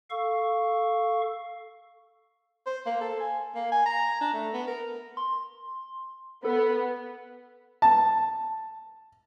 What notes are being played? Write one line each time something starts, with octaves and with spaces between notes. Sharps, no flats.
A4 F5 C#6
C5
A#3
A4
G#5
A#3
G#5
A#5
D4
A3
B3
A#4
C6
B3 A4
A5